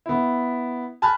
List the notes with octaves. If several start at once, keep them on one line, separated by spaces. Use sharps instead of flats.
B3 E4
G#5 A5 B5 F6 F#6